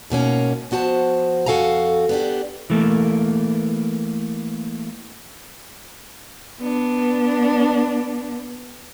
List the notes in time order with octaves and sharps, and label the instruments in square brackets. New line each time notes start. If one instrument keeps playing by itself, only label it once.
[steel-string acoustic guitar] G#2 B2 A#3 C#4
F3 B3 F#4 C5 A5
F2 F#4 A4 F5 G#5 A#5
B3 D4 G4
[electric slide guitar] E3 A3 A#3
[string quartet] B3 D4